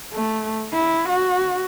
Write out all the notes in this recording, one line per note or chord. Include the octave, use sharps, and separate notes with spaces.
A3
E4
F#4